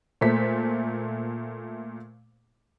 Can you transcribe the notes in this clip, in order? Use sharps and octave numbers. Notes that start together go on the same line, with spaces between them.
A#2 A3 C5 B6